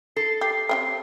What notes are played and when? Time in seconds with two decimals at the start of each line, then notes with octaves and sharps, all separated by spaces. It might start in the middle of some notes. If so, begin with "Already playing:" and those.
0.16 A4 C7
0.41 G4 C7
0.69 C4 F4 G4